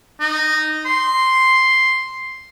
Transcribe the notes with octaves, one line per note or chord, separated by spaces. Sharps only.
D#4
C6